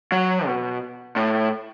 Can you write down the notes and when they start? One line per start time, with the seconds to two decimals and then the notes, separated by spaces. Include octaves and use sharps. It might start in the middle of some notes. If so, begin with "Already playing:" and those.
0.12 F#3
0.46 B2
1.16 A2